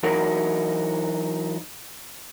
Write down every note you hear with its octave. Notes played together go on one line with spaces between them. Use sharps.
E3 F#3 D#4 F#4 A#4